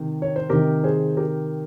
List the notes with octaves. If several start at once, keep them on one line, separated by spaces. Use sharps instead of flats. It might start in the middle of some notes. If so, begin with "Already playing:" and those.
Already playing: C3 D#3
C#5
C5
C3 D#3 G4 A#4
G#4 C5
G4 A#4